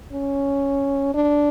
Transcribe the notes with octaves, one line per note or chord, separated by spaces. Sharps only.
C#4
D4